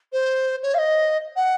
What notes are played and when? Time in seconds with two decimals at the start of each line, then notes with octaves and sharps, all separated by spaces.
0.12 C5
0.63 C#5
0.74 F5
0.78 D#5
1.36 F#5